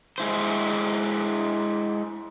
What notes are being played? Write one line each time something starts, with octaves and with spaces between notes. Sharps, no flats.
G#3 E4 C5